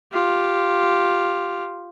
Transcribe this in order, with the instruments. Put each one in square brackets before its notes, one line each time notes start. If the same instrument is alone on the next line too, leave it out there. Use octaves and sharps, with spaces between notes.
[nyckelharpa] F4 G4